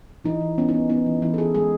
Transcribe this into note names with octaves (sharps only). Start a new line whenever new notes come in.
E3 D#4
E3
B3 C#4
D#4
B3
B3 D#4
E3
E3 E4
A4
E3 G#4
G#3 G#4